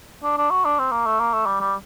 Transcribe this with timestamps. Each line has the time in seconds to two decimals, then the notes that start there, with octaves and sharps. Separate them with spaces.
0.23 D4
0.38 D4
0.50 F#4
0.65 D4
0.79 C4
0.92 A#3
1.06 A3
1.20 A#3
1.33 A3
1.46 G3
1.61 G3